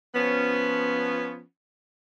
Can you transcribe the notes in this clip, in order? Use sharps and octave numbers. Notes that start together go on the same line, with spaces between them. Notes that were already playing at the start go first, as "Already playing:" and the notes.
F3 B3 C#4